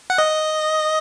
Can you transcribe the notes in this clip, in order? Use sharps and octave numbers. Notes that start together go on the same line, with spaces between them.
F#5
D#5